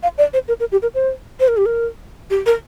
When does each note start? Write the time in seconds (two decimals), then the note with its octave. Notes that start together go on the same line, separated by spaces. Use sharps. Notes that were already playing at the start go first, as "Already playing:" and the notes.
0.03 F5
0.18 D5
0.33 C5
0.48 A#4
0.60 A#4
0.72 G4
0.82 A#4
0.94 C5
1.40 C5
1.48 A#4
1.57 G4
1.66 A#4
2.30 G4
2.46 A#4